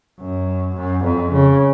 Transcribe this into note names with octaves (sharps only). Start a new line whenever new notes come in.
F#2
F#2
F2
C#3